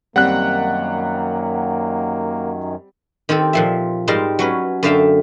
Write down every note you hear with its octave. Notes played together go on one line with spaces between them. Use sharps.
F#2 D#3 F#3 G3 A#3 C4 F#5 F#6
D#3 C4 G4 A4
A#2 F3 E5
G#2 G3 D#4 A#4 A5 C6
F#3 C#4 B4
F#2 D3 E5 F5 G5 A5